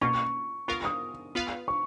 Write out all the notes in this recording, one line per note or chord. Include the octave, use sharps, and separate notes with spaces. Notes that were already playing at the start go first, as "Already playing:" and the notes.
B2 A#3 C#4 F4 C#6
B3 F4 A#4 F5 C#6
D#6
B3 F4 B4 F5
C#6